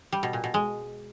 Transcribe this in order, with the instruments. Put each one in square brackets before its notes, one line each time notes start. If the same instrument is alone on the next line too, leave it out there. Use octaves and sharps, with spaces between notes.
[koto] G3
B2
A#2
B2
G#3